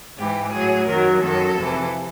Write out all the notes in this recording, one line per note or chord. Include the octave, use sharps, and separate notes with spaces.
G#2 E3 G4
A2 F#3 G#4
F#2 D#3 F#3 A#4
F#2 D#3 F#3 A4
F2 C3 E3